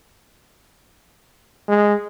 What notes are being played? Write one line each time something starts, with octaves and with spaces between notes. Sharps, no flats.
G#3